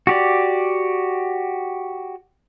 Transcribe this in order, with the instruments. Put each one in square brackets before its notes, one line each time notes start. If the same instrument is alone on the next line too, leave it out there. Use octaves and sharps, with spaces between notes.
[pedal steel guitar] F#4 G4 D5